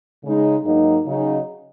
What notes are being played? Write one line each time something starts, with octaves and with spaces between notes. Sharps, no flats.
C#3 G#3 D#4
G#2 F#3 A#3 D#4
C#3 F#3 D#4